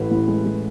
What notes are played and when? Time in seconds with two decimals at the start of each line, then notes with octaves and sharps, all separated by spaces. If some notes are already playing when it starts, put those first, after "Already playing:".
Already playing: A1 A2 B4
0.11 A1
0.28 G#3
0.45 G#3